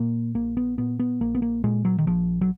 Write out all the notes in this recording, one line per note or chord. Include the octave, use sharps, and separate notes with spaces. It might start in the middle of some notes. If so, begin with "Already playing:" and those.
Already playing: A#2 A#3
A#1 A#3
B3
A#2 B3
B3
A#1 A#3
B3
A#3
A#2 G#3
F#3
D#3
A#1 F3
F#3